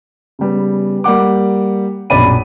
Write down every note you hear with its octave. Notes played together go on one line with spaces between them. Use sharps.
C#3 G3 B3
G3 A#3 F#5 D6
A#1 F#2 B2 D5 B5 D#7